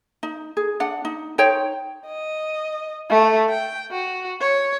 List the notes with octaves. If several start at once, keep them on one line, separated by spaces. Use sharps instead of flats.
D#4
G#4
D4 F#5
D#4
D#4 C5 C#5 G5
D#5
A3
G5
F#4
C#5